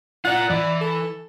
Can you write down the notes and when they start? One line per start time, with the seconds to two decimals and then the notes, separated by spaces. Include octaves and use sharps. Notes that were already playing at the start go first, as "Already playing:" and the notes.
0.25 F4 D5 F#5
0.50 E3 D5
0.81 A4